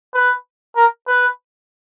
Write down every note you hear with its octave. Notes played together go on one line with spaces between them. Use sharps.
B4
A#4
B4